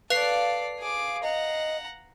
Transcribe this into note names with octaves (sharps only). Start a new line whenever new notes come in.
A4 B4 D5 F5 C7
G#4 D6
D#5 F#5 A#5